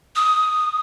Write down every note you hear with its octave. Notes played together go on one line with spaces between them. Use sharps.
D#6